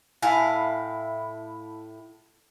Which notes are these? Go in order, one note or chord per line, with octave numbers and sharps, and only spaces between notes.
A2 E4 F5 G#5